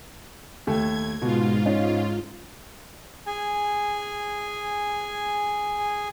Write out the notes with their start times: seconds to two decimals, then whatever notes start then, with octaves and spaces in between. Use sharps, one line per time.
0.67 D#2 A3 G#6
1.22 G#2 B2 F4
1.66 C#4 D#4
3.27 G#4 G#5